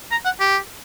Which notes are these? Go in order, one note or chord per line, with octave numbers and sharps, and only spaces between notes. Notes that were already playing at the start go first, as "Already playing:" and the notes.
A#5
F#5
G4